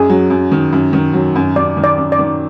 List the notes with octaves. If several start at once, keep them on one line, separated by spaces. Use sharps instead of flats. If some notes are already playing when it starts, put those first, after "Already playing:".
Already playing: F#2 G#4
F#3
F#2
D#3
F#2
D#3
F#3
F#2
F#2 D5
D#3
D5
F#2
D5
D#3